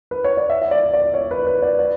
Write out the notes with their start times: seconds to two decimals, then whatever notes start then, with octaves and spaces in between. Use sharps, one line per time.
0.11 B4
0.24 C#5
0.37 D5
0.50 E5
0.62 E5
0.71 D5
0.93 D5
1.14 C#5
1.31 B4
1.47 B4
1.62 D5
1.79 D5